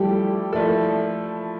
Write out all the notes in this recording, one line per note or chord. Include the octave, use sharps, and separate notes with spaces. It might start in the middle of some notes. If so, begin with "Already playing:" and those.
Already playing: F3 G3 A3 E4 G4 A4 D5
F3 A3 E4 A4 D5